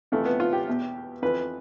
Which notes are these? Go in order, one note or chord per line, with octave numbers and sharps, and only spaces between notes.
F2 C3 E3 A3
B3
F4
G4
E2 B2
F2 E3 B4